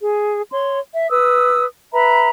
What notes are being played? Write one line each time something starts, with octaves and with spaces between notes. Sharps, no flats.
G#4
C#5 C6
E5
B4 D#6 E6
B4 E5 A#5 B5